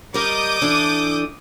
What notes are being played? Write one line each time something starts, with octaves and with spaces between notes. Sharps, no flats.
G3 A#4 D#5 D6 D#6 G6
E3 D4 A4